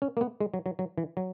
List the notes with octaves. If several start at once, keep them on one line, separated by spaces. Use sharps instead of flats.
C#4
A#3
B3
G#3
F#3
F#3
F#3
E3
F#3